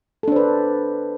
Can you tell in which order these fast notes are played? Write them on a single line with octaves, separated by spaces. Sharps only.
A4 D4 C5 B4